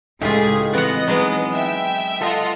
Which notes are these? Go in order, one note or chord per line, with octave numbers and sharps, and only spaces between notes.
C#2 A2 D#4 F4 G4 G#4 D#5
E3 B3 C4 D#4 D#5 F#5
F#3 G#3 B3
E5 G5
F4 A4 D#5 F#5